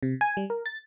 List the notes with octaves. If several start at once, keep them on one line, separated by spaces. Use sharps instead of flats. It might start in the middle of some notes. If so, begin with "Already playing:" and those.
C3
G#5
G3
A#4
A6